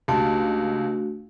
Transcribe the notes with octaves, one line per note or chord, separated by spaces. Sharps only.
C#2 A3 D4 F#4 G4 A5